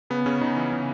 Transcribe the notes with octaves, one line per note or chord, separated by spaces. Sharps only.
C#3 B3
C#3 C#4
C#3 D#4
E3
C#3